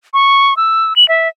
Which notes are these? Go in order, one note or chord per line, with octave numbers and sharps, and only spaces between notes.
C#6
E6
F#7
E5